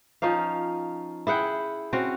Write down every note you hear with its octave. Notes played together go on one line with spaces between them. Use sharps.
F3 C#4 D#4 F5
E4 G#4 F#5 G5
C4 C#4 F#4